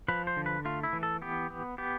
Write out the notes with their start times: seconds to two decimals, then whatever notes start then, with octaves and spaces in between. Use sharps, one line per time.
0.08 F3 B4
0.27 C5
0.37 D3
0.46 B4
0.65 A3 F4
0.83 E4
0.93 E3
1.03 A4
1.22 B3 G4
1.50 B3
1.78 B3 G4